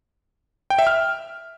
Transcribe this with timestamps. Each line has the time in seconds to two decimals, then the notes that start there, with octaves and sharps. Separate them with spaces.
0.70 G5
0.79 E5
0.87 F6